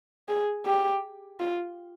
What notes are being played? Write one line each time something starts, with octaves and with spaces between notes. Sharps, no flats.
G#4
G4
F4